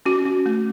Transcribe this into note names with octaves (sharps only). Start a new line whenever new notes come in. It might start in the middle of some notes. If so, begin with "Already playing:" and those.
C#4 F#4
C#4
A3